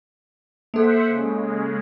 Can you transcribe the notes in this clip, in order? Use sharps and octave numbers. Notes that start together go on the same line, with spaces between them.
A#3 A4 C5 E5 F#5
C#3 G#3